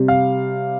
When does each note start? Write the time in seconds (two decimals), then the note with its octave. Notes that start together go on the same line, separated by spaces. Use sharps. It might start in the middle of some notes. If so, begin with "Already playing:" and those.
Already playing: C3 G3
0.08 F5